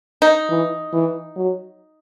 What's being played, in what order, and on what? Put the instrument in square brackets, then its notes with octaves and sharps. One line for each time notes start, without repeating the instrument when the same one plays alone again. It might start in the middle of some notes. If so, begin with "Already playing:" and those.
[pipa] D#4
[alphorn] E3
E3
F#3